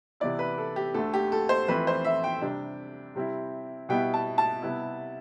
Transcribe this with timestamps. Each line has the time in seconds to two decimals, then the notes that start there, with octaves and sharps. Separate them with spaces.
0.20 C3 E3 B3 E4 D5
0.39 B4
0.58 A4
0.76 G4
0.94 D2 D3 A3 A4
1.14 G4
1.32 A4
1.49 C5
1.68 F2 E3 A3 C4 E4 B4
1.87 C5
2.05 E5
2.24 G5
2.42 C3 G3 D4
3.15 C3 G3 C4 E4
3.89 B2 G3 B3 E4 G5
4.14 A5
4.38 A5
4.62 C3 G3 B3 E4